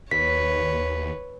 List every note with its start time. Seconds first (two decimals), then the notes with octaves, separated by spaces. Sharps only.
0.11 D#2 B4 C#5 B6